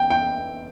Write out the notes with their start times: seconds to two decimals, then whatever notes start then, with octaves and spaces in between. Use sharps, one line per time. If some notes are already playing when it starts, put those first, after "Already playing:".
Already playing: G5
0.10 G5